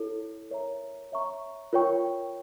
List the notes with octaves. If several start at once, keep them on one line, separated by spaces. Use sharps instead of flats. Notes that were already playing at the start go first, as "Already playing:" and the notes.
Already playing: E4 A4 C#5
A#4 C#5 E5 A#5
C#5 E5 A#5 C#6
F4 A#4 C#5 G5 C#6